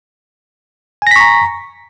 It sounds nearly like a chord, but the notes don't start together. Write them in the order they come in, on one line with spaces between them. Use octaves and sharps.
G#5 A#6 B6 C#6 A#5